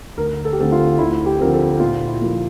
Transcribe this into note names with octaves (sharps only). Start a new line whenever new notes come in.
D2 A#4
A4
G4
D3 A3 C4 A4
F4
D2 E4
G4
D3 F3 C4 A#4
A4
A#2 F4
E4
F3 A#3